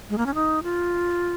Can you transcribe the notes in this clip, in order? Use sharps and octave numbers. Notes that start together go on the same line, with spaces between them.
G#3
A#3
C#4
D#4
F4